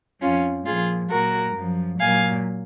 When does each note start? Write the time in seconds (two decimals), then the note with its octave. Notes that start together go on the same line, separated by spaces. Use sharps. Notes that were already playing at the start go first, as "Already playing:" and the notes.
0.22 F2 F3 C#4 F4
0.66 A#2 F3 F4 G#4
1.10 A#2 F#3 F#4 A#4
1.55 F#2 F3
1.99 A#2 F#3 F5 G#5